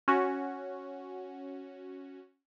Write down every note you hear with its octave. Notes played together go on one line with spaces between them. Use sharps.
C#4 F#4